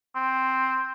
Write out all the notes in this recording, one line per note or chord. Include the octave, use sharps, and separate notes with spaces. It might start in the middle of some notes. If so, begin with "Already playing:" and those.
C4